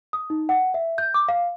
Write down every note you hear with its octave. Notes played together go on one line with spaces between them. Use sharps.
D#6
D#4
F#5
E5
G6
D6
F5